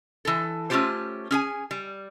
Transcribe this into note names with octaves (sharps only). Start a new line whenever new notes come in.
E3 A4
A3 C#4 E4 F4 G4 C5
C#4 G#4 G#5
G3